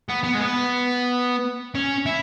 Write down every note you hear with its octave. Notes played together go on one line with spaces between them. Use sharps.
B3
B3
G#3
B3
C#4
E4